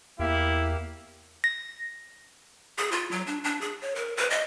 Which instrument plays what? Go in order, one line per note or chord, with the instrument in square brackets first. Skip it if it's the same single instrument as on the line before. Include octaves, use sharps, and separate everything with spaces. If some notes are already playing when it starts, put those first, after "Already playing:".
[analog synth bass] E2 [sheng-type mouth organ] A#3 G4 F5 [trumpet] E4
[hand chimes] A#6
[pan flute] G#4
F4
F#3
D4
D4
G#4
C#5
A#4
B4
D#5